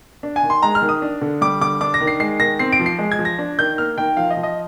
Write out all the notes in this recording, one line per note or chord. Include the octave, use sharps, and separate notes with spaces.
D4
G#5
D#3
C6
G#3 A#5
F6
D#3
D#6
D4
D3
G3 D6
D3 D6
D4 D6
A#6
D#3
C7
G#3 C7
D#3 A#6
C4 C7
D7
F3
C7
G#3
G#6
F3
A#6
D4
D#3 G6
A#3 F6
D#3 G5
F3 F5
D#5
F3
D#5